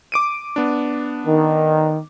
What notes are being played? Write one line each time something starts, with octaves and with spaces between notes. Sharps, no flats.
D6 D7 D#7
B3 D4
D#3